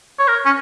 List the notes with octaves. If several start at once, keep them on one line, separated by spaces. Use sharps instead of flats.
C#5
A#4
C#4